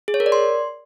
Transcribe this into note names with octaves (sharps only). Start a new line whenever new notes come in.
G#4
C#5
A#4
D5
C6